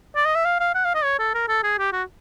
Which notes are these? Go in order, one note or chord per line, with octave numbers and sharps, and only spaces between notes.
D5
D#5
E5
F5
F5
F#5
F5
D#5
C#5
A4
A#4
A4
G#4
G4
F#4